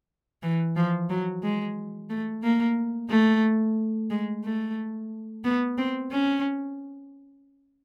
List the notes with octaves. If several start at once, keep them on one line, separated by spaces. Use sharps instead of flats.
E3
F3
F#3
G#3
A3
A#3
A3
G#3
A3
B3
C4
C#4